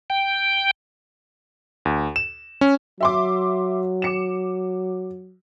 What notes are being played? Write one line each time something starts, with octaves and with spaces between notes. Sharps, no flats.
G5
D2
E7
C#4
F#3 E5 C6 D6
D6 C#7 E7